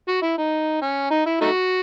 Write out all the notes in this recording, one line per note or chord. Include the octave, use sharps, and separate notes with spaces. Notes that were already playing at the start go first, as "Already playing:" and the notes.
F#4
E4
D#4
C#4
D#4
E4
A3 D#4 F#4